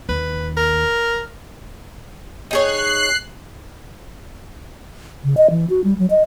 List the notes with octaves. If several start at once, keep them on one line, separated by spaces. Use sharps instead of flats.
D#2 B4
A#4
D#4 G#4 C#5 F#6 C7
C#3
D#5
E3
F#4
G3
F#3
D#5